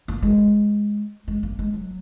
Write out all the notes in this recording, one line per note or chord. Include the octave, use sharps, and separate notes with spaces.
A#3
G#3
G#3
A#3
G#3
F#3